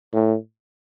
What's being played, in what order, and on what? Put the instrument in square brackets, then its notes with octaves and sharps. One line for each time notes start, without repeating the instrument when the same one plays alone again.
[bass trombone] A2